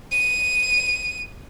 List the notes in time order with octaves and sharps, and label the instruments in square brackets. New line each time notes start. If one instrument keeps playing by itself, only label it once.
[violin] D#7